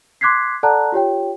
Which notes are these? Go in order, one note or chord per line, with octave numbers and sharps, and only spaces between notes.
C6 D6 F#6 G#6 B6 C7
A4 D5 F#5 A5 A#5 F#6
F4 G4 C#5 G5